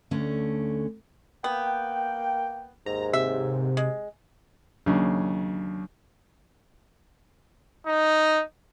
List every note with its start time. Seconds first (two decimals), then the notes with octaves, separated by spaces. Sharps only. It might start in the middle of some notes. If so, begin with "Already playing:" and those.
0.11 D2 D3 A3 C#4
1.44 A#3 B3 G5
2.86 D#2 G#2 A#5
3.13 C3 E5
3.77 G#3
4.86 D#2 C#3 F#3 D4
7.87 D#4